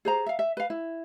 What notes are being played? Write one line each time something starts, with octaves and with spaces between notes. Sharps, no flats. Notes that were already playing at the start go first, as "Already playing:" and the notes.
G#4 C5 A#5
E5 F5
E5
B4 F5
E4